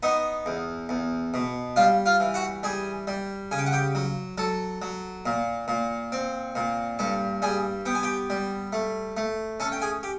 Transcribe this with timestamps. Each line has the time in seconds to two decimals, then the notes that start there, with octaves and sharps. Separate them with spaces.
0.03 B3 D#4 D#5
0.46 E2
0.89 E2
1.34 B2
1.76 G3 F4 F5
2.06 F4 F5
2.20 E3
2.34 F#4 F#5
2.63 G3 G#4 G#5
3.07 G3
3.51 C#3 G#5
3.58 G5
3.66 F#5
3.72 G4 G5
3.95 F#3
4.38 F#3 A4 A5
4.82 F#3
5.26 A#2
5.68 A#2
6.12 C4
6.55 A#2
6.99 G2 A4 A5
7.42 G3 G#4 G#5
7.86 B3 G5
7.95 G#5
8.03 G4 G5
8.30 G3
8.73 A3
9.17 A3
9.60 C#4 A4 A5
9.72 G5
9.82 G#4 G#5
10.03 G4